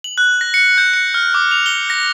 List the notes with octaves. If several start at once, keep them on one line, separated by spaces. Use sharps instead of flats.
F#7
F#6
A#6
C#7
G6
C#7
F6
D6
F7
G7
A#6